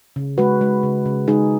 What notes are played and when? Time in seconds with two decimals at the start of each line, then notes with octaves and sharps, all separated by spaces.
0.16 C#3
0.38 G#3 F#4 B4
0.61 G#3
0.83 C#3
1.06 C#3
1.28 G#3 D#4 G#4